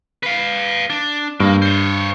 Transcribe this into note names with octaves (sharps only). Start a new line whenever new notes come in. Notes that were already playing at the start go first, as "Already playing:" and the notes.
B4 F5
D4
G2 A#3
C5 C#5